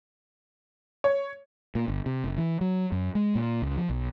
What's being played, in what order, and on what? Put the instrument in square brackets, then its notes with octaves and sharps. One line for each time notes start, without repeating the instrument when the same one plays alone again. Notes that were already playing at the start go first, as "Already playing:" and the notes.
[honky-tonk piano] C#5
[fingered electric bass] A#2
G1
C3
F#1
E3
F#3
F#2
G#3
A#2
C#2
F3
B1